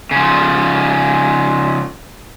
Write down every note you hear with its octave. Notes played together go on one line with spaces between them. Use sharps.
C#3 F3